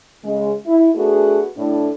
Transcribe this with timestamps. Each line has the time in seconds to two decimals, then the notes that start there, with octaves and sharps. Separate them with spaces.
0.24 C#3 G#3
0.66 E4
0.95 A3 B3 D4 F#4 G#4
1.57 A2 D4